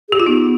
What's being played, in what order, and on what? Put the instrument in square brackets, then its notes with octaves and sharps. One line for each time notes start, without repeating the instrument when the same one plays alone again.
[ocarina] G#4
[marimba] G4
F4
[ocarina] B3 [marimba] D#4